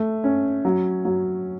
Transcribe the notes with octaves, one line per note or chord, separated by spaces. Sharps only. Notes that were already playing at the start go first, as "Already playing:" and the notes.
Already playing: A3
C#4
F#3
F#3